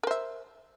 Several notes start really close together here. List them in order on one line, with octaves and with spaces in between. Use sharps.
A#4 C5 E5